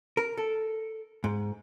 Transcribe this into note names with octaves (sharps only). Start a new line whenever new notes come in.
A#4
A4
G#2